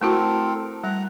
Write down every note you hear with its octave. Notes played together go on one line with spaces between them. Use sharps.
A3 C4 E4 F#4 A4 A#4
G3 F#5 A#5